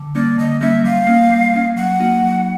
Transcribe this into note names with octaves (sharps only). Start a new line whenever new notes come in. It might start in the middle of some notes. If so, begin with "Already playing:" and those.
Already playing: D3
G3 A#3 C#4 D5
D3 D#5
G3 A#3 C#4 E5
G3 F5
A#3 C#4
G3
A#3 C#4
F#3 F#5
A#3 D#4 F#4
F#3